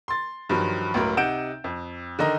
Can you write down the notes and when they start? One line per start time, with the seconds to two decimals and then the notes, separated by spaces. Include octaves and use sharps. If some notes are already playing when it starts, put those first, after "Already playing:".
0.08 C6 A6
0.49 G2 D#3 F3 F#3
0.94 C#2 A2 F#3 A#4
1.17 C3 D#4 F#5 G6 D7 E7
1.64 F2
2.19 D3 D#3 D#4 D#5 A#5